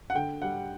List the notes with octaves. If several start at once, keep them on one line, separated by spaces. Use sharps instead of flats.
F#5
D3 G5
G3 F#5